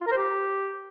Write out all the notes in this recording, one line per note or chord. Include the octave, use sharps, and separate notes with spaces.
F4
A#4
C5
G4